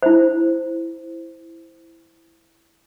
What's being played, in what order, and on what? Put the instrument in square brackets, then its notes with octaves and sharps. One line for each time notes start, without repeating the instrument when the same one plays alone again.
[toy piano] E4 C5